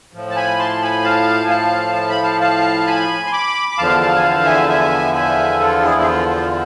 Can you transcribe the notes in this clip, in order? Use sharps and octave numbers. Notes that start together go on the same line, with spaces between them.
A2 F3
A5
G#5 B5
A5 C6
G#5 B5
F5 A5
G#5
F5 A5
A5
B5
F5 A5
F5 A5
G#5 B5
C6
B5 D6
B5
E2 D3 F3 F5 A5
F5 A5
G#5
F5 A5
E5 G#5
A5
E5 G#5
E5 G#5
F4 A4
E4 G#4
G#4
F4
F4